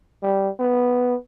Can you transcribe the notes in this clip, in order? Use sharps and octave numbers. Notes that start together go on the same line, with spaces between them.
G3
B3